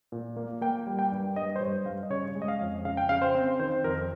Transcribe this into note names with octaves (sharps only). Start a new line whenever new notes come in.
A#2
A#3
A#3 G5
G3
G5
G2
G2 D#5
C5
G2 C#5
G2 F5
D#5
C#3 C#5
G#3
D#5
F5
F2
C#3 F5
G5
C#3 F5
C5
C4
D#3 C5
F2 A#4